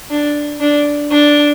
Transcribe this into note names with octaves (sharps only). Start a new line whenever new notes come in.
D4
D4
D4